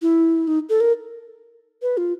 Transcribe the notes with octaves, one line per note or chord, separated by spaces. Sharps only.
E4
D#4
A4
A#4
B4
F4